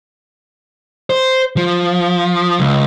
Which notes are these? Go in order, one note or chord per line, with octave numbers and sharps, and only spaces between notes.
C5
F3
C#2